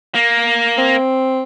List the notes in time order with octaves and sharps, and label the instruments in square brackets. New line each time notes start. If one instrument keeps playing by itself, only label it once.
[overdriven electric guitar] A#3
[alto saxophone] C4